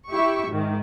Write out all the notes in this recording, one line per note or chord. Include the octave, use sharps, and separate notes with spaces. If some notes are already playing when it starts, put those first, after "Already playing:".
E4 G4 E5 C#6
G#2 D#3